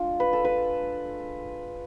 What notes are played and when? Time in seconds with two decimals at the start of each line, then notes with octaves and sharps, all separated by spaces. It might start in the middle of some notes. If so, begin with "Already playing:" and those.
Already playing: G#3 D4 F4
0.20 B4
0.33 A4
0.45 B4